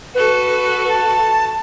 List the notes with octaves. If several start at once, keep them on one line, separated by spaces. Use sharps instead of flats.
F#4 A4 B4
A5